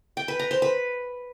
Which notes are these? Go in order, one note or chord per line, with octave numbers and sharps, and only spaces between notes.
G5
B4
A#5
C5
B4